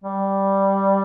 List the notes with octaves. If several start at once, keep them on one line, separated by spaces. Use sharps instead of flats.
G3